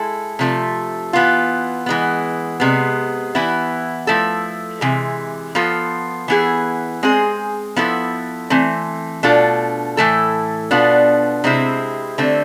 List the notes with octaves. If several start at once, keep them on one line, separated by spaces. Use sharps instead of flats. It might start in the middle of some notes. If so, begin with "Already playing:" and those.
Already playing: G#3 E4 A4
C3 F3 A3
E3 B3 F4
E3 G#3 B3
C3 G#3 B3
E3 B3 E4
F3 A3 E4 A4
C3 E3 G#3
F3 B3 F4 A4
E3 B3 E4 G#4
G#3 C4 G#4
F3 B3 E4 A4
E3 A3 C4
B2 A3 D4 F4 A4
A2 E3 A3 E4 A4
B2 B3 D4 F4
C3 G#3 C4 E4
D3 A3 C4